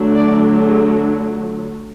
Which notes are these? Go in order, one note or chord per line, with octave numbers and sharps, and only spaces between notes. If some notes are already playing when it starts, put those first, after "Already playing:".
Already playing: D3 F#3 A3 D4
D5
G#4
D4